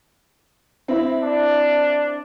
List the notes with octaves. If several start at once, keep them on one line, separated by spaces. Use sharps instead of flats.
C4 E4 E5
D4